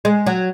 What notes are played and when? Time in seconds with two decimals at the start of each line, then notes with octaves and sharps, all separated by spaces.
0.05 G#3
0.26 F#3